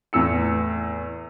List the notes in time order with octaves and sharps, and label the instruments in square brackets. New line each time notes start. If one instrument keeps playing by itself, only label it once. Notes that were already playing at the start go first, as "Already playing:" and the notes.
[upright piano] E2 A2 E6 C#7